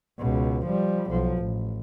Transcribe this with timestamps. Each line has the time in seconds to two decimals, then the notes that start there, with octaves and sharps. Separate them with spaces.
0.19 C#2 B2
0.67 F3 G3
1.10 B1 F3
1.38 A1